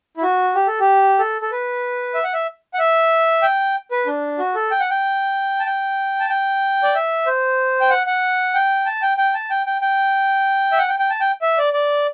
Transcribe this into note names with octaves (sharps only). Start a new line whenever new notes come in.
E4
F#4
G4
A4
G4
A4
A4
B4
E5
F#5
E5
F#5
E5
G5
B4
D4
F#4
A4
G5
F#5
G5
A5
G5
A5
G5
D5
E5
C5
G5
F#5
F#5
G5
A5
G5
G5
A5
G5
G5
G5
E5
F#5
G5
G5
A5
G5
E5
D5
D5